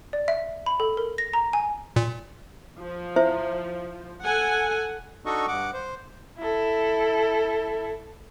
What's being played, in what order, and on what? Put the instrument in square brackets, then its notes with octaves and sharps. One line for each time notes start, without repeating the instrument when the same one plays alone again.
[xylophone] D5
E5
B5
A4
A#4
A#6
A#5
G#5
[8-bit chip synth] A#2
[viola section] F3
[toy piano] E4 C5 E5
[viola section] A4 F#5 G#5
[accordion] D4 D#4 F#4 A4 D#5 C#6
G2 F#5 D6
C5
[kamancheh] E4 A4